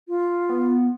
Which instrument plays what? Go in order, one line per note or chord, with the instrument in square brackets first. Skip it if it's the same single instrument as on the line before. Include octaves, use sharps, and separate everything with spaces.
[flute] F4
[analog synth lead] B3